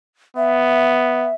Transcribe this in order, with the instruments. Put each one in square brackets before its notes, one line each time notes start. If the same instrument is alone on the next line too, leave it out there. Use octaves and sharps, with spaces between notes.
[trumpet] B3 [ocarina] E5